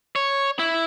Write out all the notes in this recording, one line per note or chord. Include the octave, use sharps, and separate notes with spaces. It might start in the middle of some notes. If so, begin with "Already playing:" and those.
C#5
E4